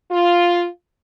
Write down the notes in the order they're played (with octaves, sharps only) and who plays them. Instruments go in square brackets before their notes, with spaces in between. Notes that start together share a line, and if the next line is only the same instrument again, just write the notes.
[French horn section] F4